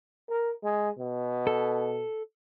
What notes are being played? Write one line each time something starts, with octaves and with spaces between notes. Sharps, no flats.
A#4
G#3
B2
A4